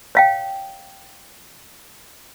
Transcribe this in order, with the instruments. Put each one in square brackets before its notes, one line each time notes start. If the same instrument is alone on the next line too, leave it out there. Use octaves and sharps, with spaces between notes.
[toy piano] C#5 F5 G5